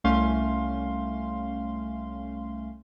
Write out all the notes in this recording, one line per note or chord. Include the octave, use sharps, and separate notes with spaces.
C2 A3 C#4 F5 C6